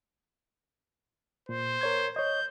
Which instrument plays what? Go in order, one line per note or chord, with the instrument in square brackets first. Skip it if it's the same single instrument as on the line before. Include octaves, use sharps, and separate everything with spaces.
[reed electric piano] A#2 [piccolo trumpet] C5
[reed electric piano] A#4 C#5 G#6
[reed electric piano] C#5 D#5 [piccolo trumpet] G6